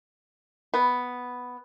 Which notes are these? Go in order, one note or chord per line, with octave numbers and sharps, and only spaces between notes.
B3